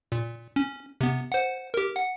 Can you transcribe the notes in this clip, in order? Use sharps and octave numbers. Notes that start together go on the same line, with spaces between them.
A#2
C#4
C3 B3
C5 F#5
G4 A#4
F#5